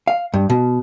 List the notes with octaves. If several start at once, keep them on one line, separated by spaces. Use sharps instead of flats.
F5
G2
B2